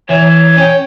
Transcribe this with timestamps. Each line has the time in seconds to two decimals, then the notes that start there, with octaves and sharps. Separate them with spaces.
0.09 E3 C#5
0.57 C#4 G5